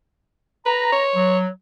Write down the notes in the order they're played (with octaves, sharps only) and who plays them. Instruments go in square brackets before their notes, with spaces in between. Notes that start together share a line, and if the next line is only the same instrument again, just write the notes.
[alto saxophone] B4 [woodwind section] A#5
[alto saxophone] C#5
[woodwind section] F#3